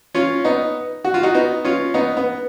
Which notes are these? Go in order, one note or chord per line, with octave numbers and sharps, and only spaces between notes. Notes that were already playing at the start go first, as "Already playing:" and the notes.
C#4 F4
B3 D#4
F#4
F4
D#4 F#4
B3 D#4
C#4 F4
B3 D#4
B3